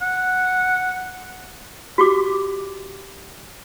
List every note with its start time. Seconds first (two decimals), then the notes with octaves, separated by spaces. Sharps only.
0.02 F#5
1.98 F#4 G4 D6